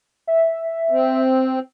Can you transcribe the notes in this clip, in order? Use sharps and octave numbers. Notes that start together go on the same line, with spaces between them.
E5
C4